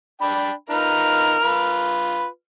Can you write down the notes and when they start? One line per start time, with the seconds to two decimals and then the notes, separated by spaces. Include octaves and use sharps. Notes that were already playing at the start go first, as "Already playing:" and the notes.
0.22 D4 G5 B5
0.70 D#4 F4 A#4 B4 F6
1.43 F4 B4